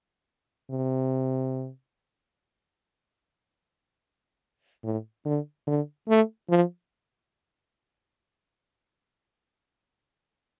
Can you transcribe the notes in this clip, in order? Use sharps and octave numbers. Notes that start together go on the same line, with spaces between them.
C3
A2
D3
D3
A3
F3